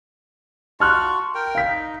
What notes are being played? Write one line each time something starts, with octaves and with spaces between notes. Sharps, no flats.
F4 F#4 A5 C#6 F6 F#6
A#4 G5
F5 B6
D#4